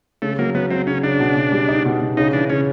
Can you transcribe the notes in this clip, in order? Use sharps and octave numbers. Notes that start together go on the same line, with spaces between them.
C#3 A3
F#3 A#3
F#3 B3
F#3 C4
C#3 C#4
C#3 D4
B2
B2
G3
D#4
B2
B2
C#3 D#4
E3 D4
C#3 C#4